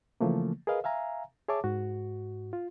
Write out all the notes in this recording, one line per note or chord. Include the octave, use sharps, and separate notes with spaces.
C#3 E3 F3 A3 A#3
G#4 A#4 B4 D#5 F5
E5 F5 G#5 A#5
G#4 C#5 E5 A5 D6
G#2 F#4
F4